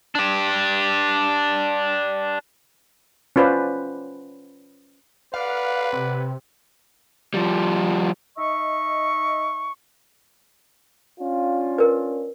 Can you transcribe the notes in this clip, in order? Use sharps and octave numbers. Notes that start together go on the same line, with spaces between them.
D4 G4
C#4 F4 B4 C5 D5
B4 D5 F5 F#5
C3
F3 G3
D#4 D#5 E5 C#6
C#4 D4 F4
A#4 B4